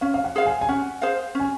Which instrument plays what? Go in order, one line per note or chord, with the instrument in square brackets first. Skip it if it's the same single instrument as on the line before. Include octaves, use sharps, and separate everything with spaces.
[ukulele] C#4 [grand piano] F5
[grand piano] F5
F#5
[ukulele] G#4 C5 F5
[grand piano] G#5
G#5
[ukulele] C#4 [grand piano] F#5
[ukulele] G#4 C5 F5
[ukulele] C#4 [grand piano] G#5